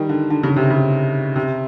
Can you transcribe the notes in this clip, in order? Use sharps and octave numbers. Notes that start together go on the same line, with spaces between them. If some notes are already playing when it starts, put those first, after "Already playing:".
Already playing: D#3 G3
D3
D3
C#3
C3
C#3
C3